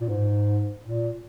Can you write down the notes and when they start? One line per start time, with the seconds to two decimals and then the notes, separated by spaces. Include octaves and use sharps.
0.01 A#2
0.09 G#2
0.84 A#2